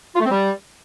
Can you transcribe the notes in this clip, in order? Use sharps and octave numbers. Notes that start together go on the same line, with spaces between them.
F4
A3
C4
G3